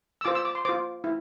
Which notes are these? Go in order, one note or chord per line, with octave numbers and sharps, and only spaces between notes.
E6
F4 C5 D6
E6
D6
C6
F4 C5 D6
E4